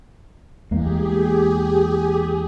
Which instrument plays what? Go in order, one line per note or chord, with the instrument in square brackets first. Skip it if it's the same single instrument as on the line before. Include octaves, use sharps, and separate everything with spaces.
[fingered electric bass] E2 G#3 A#3 [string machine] G4 G#4